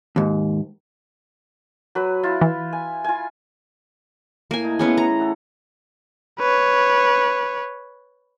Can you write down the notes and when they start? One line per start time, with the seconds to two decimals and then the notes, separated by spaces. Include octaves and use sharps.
0.16 D#2 G#2
1.95 F#3 B4
2.23 E4 F4
2.41 E3
2.73 G#5
3.04 F4 G#5
4.51 A2 A#3 G#5
4.64 D#4
4.79 E3 B3 C#4 E4 G#4
4.97 A#5
5.20 A4 E5 F#5
6.39 B4 C#5